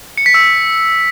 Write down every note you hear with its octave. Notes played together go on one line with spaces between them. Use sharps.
C#7
B6
E6